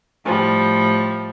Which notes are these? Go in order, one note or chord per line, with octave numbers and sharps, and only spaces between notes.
A2 F3 G3